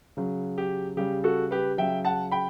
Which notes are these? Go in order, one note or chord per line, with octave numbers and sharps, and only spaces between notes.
C#3 F#3
G4
C#3 G3 G4
F#4 A4
G4 B4
C#3 F#3 E5 G5
F#5 A5
G5 B5